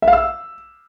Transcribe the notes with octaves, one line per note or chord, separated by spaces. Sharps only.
E5
F5
E6